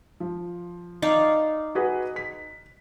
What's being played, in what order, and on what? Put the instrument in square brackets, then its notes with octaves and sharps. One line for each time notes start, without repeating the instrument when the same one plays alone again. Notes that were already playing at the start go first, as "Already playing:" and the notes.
[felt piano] F3
[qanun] D#4 D5 F5
[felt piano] F#4 G#4 B4
B6